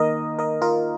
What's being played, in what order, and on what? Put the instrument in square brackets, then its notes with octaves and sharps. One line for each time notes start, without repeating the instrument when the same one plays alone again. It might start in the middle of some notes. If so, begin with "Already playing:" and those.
Already playing: [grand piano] D#3 A#3 [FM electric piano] A#4 D#5
[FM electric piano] A#4 D#5
F4 A#4